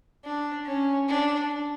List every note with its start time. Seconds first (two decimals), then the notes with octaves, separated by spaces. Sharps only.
0.24 D4
0.66 C#4
1.08 D4